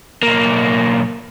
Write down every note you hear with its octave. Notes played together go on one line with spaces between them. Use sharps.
B1 A#3